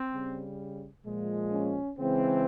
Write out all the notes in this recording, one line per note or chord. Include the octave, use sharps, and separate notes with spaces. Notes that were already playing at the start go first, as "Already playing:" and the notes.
Already playing: C4
C#3 G3
A#2 F3 G#3
C#4
C#3 E3 G#3 C4